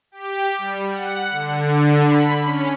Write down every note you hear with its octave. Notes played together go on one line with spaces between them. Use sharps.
G4
G3
F#5
D3
B5
C#4